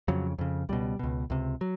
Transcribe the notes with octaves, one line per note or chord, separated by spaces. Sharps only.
F2 C#3 F#3
F2 C#3
C#2 B2 G3
C#2 B2
C#2 C3
F#3